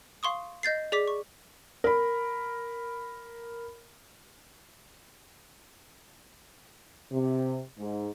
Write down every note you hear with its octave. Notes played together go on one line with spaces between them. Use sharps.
F5 C6 C#6 D#6
D#5 G6 A6 C7
G#4 D5 D6 B6
C#6
A#4 B5
C3
G#2